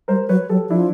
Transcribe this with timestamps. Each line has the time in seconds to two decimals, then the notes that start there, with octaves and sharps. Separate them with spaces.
0.08 G3 A#4 C5
0.29 F#3 B4 C#5
0.50 F#3 G4 A4
0.70 F3 D4 E4